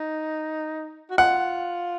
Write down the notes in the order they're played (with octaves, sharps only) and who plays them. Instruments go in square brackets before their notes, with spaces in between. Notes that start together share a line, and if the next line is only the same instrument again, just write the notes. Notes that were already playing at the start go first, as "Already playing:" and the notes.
Already playing: [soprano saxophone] D#4
F#4
[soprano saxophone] F4 [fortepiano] F#5